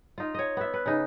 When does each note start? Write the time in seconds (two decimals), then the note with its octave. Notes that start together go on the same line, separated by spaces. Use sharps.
0.18 D#4 F4
0.34 C#5 D#5
0.57 B3 E5
0.74 B4
0.86 C#3 D#4